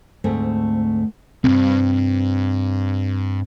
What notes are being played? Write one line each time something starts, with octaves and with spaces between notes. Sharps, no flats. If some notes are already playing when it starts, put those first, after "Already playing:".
D2 G#2 A3 C4
B1 G2 C4